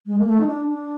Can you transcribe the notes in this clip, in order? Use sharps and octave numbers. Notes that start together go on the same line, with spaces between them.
G#3
A#3
A3
D#4
D4
D4